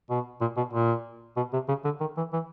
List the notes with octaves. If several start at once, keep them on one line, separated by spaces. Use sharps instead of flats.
B2
A#2
B2
A#2
B2
C3
C#3
D3
D#3
E3
E3